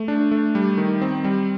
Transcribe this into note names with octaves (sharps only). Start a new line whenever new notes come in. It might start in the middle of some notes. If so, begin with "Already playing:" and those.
Already playing: A3
D4
A3
G3
D#3
C4
G3